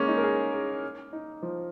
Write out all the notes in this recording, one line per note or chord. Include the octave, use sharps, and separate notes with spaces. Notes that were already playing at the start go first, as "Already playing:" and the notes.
Already playing: G#3 A#3 C#4
D#4
A#4
G#4
G#4
D#4
F3